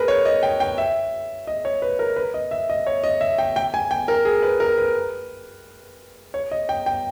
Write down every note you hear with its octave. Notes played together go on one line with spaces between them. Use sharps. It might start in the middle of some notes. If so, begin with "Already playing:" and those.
Already playing: G#4 A#4 B4
C#5
D#5
G5
G5
E5
D#5
C#5
B4
A#4
B4
D#5
E5
D#5
C#5
D#5
E5
G5
G5
G#5
G5
A#4
G#4
B4
A#4
B4
C#5
D#5
G5
G5